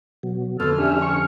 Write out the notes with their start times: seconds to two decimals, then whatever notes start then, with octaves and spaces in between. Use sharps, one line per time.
0.23 B2 F#3
0.60 F2 D3 B3 A4 F6
0.78 C#4 D4 G4 E5
1.02 C#6